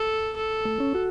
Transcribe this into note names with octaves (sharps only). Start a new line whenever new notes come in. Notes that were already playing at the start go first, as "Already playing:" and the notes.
Already playing: A4
A4
A3
C#4
F#4